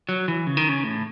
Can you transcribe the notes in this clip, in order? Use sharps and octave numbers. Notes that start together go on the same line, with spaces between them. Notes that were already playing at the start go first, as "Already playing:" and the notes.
F#3
E3
C#3
D#3
C#3
A2